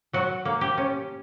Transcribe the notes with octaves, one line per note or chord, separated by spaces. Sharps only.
F#3 F#4
A#3
G4
C#4